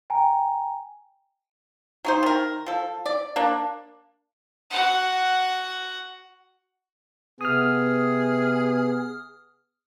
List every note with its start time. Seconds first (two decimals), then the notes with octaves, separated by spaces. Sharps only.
0.10 G5 G#5 A#5
2.05 F#3 D#4 C5
2.23 D#3 A#4
2.66 F3 A4
3.06 D5
3.36 A#3 D4
4.71 F#4 F#5
7.41 C3 B3 G#4 D#6 F6